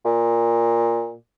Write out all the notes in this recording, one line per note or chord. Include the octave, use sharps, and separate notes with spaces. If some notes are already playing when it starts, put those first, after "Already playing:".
A#2